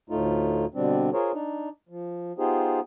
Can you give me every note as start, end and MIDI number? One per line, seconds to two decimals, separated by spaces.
0.10 0.65 38
0.10 0.65 45
0.10 0.65 57
0.10 0.65 63
0.10 0.65 65
0.75 1.10 47
0.75 1.10 50
0.75 1.10 55
0.75 1.10 60
0.75 1.10 62
1.13 1.32 65
1.13 1.32 68
1.13 1.32 70
1.13 1.32 72
1.13 1.32 73
1.33 1.69 62
1.33 1.69 63
1.89 2.32 53
2.38 2.80 59
2.38 2.80 63
2.38 2.80 65
2.38 2.80 67
2.38 2.80 68
2.38 2.80 72